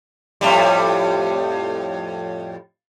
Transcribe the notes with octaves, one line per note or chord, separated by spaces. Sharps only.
F2 A2 G3